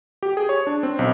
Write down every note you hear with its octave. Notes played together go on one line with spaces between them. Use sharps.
G4
G#4
C#5
D4
C4
B1